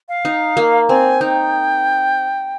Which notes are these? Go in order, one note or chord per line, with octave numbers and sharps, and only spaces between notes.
F5
D#4
A#3
C4 G#5
D#4 G5